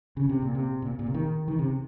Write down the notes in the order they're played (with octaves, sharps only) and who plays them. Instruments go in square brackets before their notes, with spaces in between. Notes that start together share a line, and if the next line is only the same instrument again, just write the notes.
[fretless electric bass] C#3
C3
A#2
C3
A#2
A#2
C3
D#3
D#3
C3